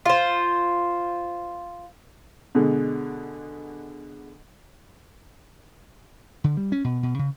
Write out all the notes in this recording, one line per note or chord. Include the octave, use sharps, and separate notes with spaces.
F4 C5
B2 D3 G#3
D3
G3
C#4
B2
B2
C#3